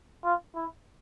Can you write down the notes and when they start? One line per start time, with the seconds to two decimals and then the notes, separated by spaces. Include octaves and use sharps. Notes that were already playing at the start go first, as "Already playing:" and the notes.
0.25 F4
0.55 E4